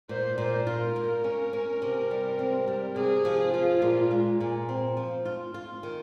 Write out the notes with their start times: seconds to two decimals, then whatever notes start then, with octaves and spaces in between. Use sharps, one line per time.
0.09 A#2 C5
0.38 A#2 C5
0.67 F4 A#4
0.96 A#3
1.24 C#4
1.53 C#4
1.82 C3
2.11 G3
2.39 C4
2.67 G3
2.96 C3 G#4
3.25 F3
3.53 F3 F4
3.82 A#2
4.11 G#3
4.40 A#2
4.69 C4
4.97 F3
5.25 F4
5.54 F4
5.83 D#3